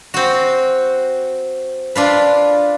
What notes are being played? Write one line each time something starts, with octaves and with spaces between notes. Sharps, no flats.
C4 F#4
D4 F4 B4